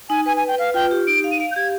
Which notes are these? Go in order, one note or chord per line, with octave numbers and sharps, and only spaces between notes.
D#4 G#5
B4 G#5
G#5
B4
G5
B4 F5
F4 G5
G4
D#4 D7
F5
D#7
F5 D7
G6
G4 G#6